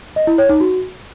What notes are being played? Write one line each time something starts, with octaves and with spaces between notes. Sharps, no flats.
D#5
E4
C#5
D#4
F#4